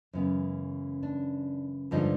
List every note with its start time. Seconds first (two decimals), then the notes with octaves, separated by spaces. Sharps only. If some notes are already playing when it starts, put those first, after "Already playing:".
0.13 F#2 C#3 E3 G#3 B3
1.03 D4
1.91 G2 D3 F3 G#3 D#4